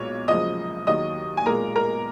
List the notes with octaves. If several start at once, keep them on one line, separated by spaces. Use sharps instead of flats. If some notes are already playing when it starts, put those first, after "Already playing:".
Already playing: B1 A#2 G#3 C#5 C#6
F#1 F#2 F3 G#3 D#5 D#6
D#2 D#3 F#3 D#5 D#6
G#5
B1 A#2 G#3 A#4 A#5
A#4 A#5